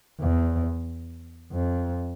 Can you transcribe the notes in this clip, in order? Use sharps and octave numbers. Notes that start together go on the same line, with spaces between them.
E2
F2